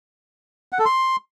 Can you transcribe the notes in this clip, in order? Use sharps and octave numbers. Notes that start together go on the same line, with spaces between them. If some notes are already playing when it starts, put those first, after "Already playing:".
F#5
A4
C6